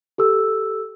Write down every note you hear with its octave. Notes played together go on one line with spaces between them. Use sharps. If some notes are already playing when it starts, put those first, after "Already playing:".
G4 A4 E6